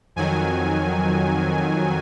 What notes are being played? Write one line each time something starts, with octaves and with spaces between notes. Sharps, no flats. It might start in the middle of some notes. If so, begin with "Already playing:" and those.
F2 D#3 F#3 G#5